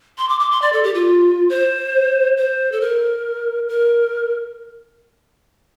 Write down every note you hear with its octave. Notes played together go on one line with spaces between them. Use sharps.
C6
D6
D6
C6
D5
A4
G4
F4
C5
C5
A4
A#4
A#4